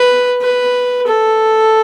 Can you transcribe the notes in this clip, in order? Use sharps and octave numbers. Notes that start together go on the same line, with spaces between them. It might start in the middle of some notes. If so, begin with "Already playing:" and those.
Already playing: B4
B4
A4